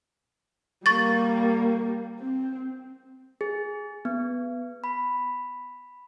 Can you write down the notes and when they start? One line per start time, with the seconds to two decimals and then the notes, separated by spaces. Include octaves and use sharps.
0.86 G3 A#3 C#6 A6
2.19 C4
3.41 G#4
4.05 B3
4.84 B5